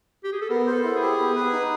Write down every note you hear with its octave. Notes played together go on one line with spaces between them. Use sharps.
G4
G#4
A4
B3 A#4
C5
A4
E4
G#4
G4
B3
B4
D#4